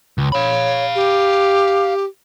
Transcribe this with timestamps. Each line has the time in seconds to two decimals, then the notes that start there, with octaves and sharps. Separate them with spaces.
0.18 C#2
0.32 C#5 F5 B5
0.95 G4